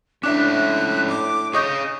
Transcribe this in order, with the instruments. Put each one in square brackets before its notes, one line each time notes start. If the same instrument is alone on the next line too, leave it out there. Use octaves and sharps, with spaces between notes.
[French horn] A2 [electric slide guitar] C#4 D5 E5 [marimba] D4 [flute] F#6
[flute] D6
[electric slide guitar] G#4 C#5 [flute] D#5 [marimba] C#6 D#6 G6